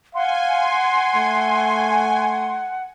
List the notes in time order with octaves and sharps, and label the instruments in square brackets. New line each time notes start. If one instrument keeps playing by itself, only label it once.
[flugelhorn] F5 [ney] F#5 [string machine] G#5 [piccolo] C6
[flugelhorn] A3